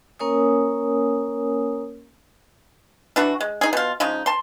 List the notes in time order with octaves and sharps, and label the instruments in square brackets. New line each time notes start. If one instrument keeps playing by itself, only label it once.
[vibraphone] A#3 C#4 A#4 C#5 G#5 D#6
[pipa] E3 D4 F#4
G#3
D#4 G#4
B2 F4
C#3 F3 G#3 D#4
A5 C6